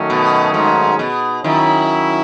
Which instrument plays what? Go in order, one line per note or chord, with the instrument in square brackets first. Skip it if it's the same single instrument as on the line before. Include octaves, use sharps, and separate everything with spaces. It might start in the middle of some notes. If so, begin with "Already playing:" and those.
Already playing: [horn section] D#3 F#3 A3 C#4
[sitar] B2
G#2
B2
[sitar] D#3 [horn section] F#3 C#4 E4